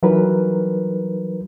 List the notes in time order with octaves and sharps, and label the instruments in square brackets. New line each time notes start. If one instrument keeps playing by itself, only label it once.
[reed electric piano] E3 F#3 G3 D#4 A#4 B4